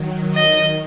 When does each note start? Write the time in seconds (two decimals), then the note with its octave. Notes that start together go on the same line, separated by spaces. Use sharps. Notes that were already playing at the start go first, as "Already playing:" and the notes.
Already playing: D#3 F#3
0.35 D#3 D#5